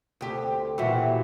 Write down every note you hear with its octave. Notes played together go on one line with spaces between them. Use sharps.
D2 C4 F4 G4 A4
A#2 E3 E4 F#4 G4 A4 E5 F#5